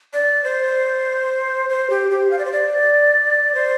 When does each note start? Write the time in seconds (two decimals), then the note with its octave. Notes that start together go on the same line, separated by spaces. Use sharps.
0.13 D5
0.44 C5
1.69 C5
1.90 G4
2.11 G4
2.31 F5
2.39 D5
2.45 C5
2.53 D5
3.55 C5